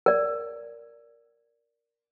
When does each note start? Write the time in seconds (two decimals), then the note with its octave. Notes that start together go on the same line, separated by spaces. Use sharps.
0.06 A#4 D5